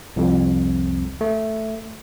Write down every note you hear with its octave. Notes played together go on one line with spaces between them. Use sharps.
C2 F2
A3